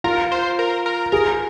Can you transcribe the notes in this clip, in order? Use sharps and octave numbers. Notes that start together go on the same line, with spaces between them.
F4 A#4
C5
A#4
A#4
G#4 A#4